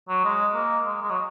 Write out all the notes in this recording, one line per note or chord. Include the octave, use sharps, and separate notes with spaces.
F#3
G#3
A#3
G#3
G#3
F#3